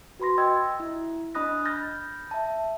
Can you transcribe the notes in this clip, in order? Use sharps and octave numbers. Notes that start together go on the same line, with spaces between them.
F#4 B4 B5 C6 A#6
D#5 G5 E6 G#6 A6
E4
D4 D#5 B5 D#6 F#6 A#6
B5 F6 G6 A6 A#6
E5 A5